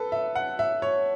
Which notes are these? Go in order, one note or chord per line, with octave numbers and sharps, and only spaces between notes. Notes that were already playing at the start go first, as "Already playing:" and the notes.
Already playing: A4 B4
E5
F#5
E5
C#5